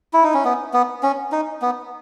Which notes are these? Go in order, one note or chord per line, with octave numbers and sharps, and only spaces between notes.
E4
D#4
C#4
B3
B3
C#4
D#4
B3